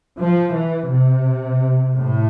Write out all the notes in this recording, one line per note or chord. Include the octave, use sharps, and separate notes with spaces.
F3
E3
C3
A2